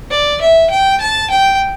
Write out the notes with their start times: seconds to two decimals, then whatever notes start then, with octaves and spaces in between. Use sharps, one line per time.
0.11 D5
0.41 E5
0.70 G5
1.01 A5
1.30 G5